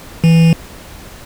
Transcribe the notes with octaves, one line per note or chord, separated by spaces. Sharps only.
E3